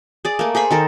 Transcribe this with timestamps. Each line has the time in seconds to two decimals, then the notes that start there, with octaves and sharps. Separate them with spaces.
0.25 G#4 D5
0.39 A3 A#3
0.55 G#4 C5 B5 C#6
0.71 D#3 A4 A#4